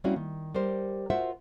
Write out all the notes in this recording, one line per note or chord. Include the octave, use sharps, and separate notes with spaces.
G3 A#3 C4 C#4 E4 F#4
D#3
G3 G4 A#4 C5
F4 F#4 A#4 C5 E5 F#5